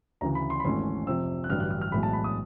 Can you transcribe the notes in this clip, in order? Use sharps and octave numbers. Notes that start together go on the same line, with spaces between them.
D2 C#3 E3 A#5
B5
C6
B5
G#1 G#2 E3 A3 C#4 C6
F2 C3 F3 E6
F#6
A1 G2 D3 F#3 F6
F#6
F6
F6
B1 A2 E3 G#3 B5
A5
B5
D#6